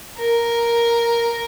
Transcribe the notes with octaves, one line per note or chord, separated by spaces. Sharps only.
A#4